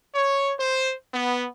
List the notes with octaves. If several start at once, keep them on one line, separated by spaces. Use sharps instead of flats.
C#5
C5
B3